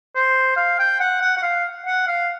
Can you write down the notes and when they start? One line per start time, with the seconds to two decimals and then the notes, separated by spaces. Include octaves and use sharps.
0.15 C5
0.57 F5
0.79 G5
1.00 F#5
1.22 F#5
1.37 F#5
1.42 F5
1.86 F#5
2.07 F5